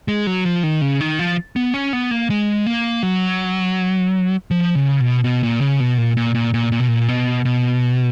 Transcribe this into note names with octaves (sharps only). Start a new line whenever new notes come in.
G#3
F#3
F3
D#3
C#3
D#3
F3
B3
C#4
B3
A#3
G#3
A#3
F#3
F3
C#3
B2
B2
A#2
C#3
B2
A#2
A#2
A#2
A#2
A#2
B2
A#2
B2
B2